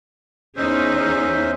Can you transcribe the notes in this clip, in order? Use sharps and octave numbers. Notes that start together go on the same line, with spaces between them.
E2 C#4 D#4 G#4 C5 E5